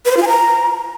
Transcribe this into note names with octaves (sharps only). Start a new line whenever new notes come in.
B4
C5
F4
G#5
A#5